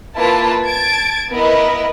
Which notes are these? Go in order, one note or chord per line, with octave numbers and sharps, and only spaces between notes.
A#3 E4 F4 B4 A5
A5 G#6 A6 D7
B3 E4 A#4 B4 D#5